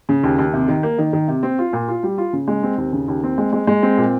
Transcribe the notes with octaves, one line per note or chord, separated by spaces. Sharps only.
C#3
D#2
D#2
C3
D#3
A#3
D#3
D#3
C3
C4
F4
A#2
F4
G3
F4
C#3
G#3
C4
D#2
C#3
D#2
C4
G#3
G#3
G#3
C4
A#2